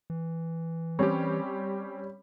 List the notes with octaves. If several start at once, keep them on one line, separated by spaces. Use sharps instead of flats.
E3
G3 C4 C#4 G4 C#5